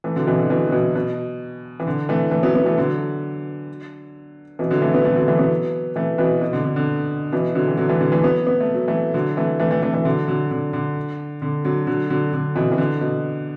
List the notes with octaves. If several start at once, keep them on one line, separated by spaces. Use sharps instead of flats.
E3 A3
D3 F#3
B2 E3
D3
B2 E3
F#3
B2 E3
B2
E3
D3
E3 A3
E3 A3
F#3 B3
F#3 B3
E3 A3
D3 F#3
B2 E3
D3 F#3
E3 A3
F#3 B3
E3 A3
D3 F#3
E3 A3
F#3 B3
E3 A3
B2 E3
B2
D3
D3
D3
B2 E3
D3 F#3
E3
D3 F#3
E3 A3
D3 F#3
E3 A3
F#3 B3
B3
A3
F#3
E3 A3
D3 F#3
E3 A3
E3 A3
E3 A3
E3 A3
E3 A3
D3 F#3
D3 F#3
D3
D3
D3
D3 F#3
D3 F#3
D3 F#3
D3
B2 E3
E3
D3
B2